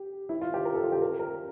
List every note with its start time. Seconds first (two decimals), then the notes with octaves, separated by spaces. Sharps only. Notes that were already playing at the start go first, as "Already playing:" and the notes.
Already playing: G4
0.29 E4
0.41 F4
0.54 G4
0.65 A#4
0.74 A4
0.84 F4
0.92 G4
1.02 A#4
1.19 A#4